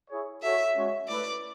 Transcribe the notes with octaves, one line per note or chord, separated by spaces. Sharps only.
E4 G#4 C#5
F#4 A4 C#5 E5
G#3 C#4 F#4 C#5
A3 E4 B4 D5 E5